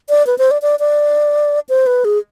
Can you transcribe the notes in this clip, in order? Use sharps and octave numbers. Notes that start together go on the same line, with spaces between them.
D5
B4
C5
D5
D5
D5
C5
B4
G#4